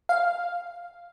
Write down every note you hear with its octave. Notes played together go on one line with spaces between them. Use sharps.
F5